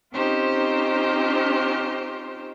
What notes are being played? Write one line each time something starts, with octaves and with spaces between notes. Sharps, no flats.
C4 C#4 D#4 F4 G4 C5